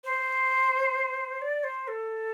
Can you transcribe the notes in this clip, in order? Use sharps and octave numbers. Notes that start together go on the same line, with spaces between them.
C5
D5
C5
A4